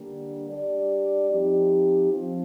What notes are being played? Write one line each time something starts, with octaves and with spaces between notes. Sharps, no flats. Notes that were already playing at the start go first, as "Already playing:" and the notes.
Already playing: D3 G3 A#3 D4
G3 D4 G4 D5
F3 C4 D#4 G4
F3 C4 F4